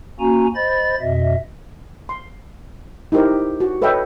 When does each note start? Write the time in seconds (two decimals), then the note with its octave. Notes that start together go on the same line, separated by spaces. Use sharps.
0.20 A#3 C#4 F#4 G#5 A#5
0.55 C5 D#5 B5 A6
1.01 F2 B2 D#5 E5
2.09 C6
3.12 D#4 E4 G4 A#4 C5
3.60 F#4
3.82 A4 B4 C#5 D#5 E5 G5